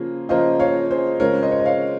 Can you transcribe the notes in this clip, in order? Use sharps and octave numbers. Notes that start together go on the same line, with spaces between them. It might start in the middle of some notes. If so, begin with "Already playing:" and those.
Already playing: C#3 F3 A#3 F4 G#4
C#3 F3 A#3 F4 C5 D#5
C#5 F5
G#4 C5
C#3 G#3 C4 F4 A#4 C#5
C5 D#5
C#5
D#5
C#5 F5